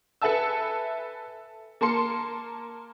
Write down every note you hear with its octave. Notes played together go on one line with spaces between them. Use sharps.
A4 B4 E5 G#5 A5 E6
A#3 A#4 A5 C6 C#7